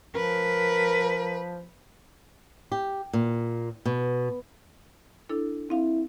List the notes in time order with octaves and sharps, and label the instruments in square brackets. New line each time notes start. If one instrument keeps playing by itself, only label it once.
[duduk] F3 [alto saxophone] A#4 [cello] B4
[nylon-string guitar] G4
A#2
B2
[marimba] D4 E4 A4
[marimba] C4 F5 [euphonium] E4